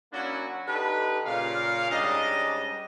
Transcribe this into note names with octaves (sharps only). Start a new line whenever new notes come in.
F#3 A#3 C#4 D4 E4 F#4
D3 D#4 G4 B4
A#2 C#3 F5
G#2 G3 C#4 D4 D#5